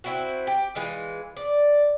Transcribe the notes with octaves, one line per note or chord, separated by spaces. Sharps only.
C4 E4 F#4
G4
E3 G#3 F4
D5